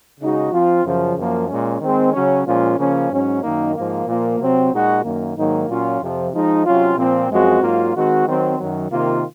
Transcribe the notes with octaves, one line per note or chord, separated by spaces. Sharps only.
C#3 G#3 D#4 F#4
F3 C4 F4
F#2 C#3 F3
F#2 F3 A#3
A#2 G#3 C#4
D#3 G#3 C4
C#3 F#3 C#4
A#2 F3 G#3 C#4 F4
C#3 F3 A#3 C#4
G#2 F#3 C#4
F#2 D#3 A#3 D#4
G#2 F3 A#3
A#2 F3 A#3 F4
C3 F#3 C4
A#2 G#3 D#4 F#4
F#2 D#3 A#3
G#2 D#3 F#3 A#3 D#4
A#2 F#3 C#4 F4
F2 C3 F3
F3 G#3 D#4
C3 F#3 C#4 F4
A#2 F3 C4
F#2 F3 G#3 C4 F#4
G#2 F#3 A#3 F4
D#3 G#3 C4 F#4
D#3 F#3 C4
F#2 D#3 F#3
C3 D#3 A#3 F4